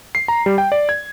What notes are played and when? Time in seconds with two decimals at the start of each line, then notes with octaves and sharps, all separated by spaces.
0.15 C7
0.28 A#5
0.46 G3
0.58 G5
0.72 D5
0.89 G#6